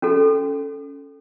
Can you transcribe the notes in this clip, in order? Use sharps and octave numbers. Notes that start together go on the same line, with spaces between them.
C#4 F#4 A4